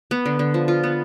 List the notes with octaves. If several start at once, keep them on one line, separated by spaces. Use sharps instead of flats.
B3
D3
D3
F3
F4
B3